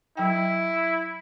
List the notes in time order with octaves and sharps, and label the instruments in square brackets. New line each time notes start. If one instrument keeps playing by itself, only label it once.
[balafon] F#3 G5 [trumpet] E4